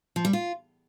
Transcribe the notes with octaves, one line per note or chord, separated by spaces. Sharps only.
F3
G3
F4